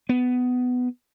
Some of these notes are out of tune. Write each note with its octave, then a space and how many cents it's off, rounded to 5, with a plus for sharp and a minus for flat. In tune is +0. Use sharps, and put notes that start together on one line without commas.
B3 +15